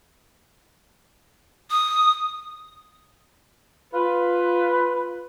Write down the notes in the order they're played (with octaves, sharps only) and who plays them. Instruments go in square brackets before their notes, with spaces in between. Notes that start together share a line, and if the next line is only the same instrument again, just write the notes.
[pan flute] D#6
[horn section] F4 B4